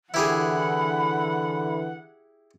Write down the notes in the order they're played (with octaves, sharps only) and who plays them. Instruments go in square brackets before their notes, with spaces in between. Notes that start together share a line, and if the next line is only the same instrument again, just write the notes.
[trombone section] D3 E3 [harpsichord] E4 G4 G#4 [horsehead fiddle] F#5 [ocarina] B5